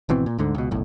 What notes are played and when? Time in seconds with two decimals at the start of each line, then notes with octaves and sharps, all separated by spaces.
0.09 G#1 B2 E3 C4
0.26 A#2
0.38 D2 G#2 D3
0.55 C#2 B2
0.71 F#1 B1 A2